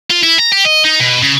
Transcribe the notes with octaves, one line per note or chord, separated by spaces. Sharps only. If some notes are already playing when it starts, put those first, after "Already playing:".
F4
E4
A#5
G4
D#5
D#4
B2
C#3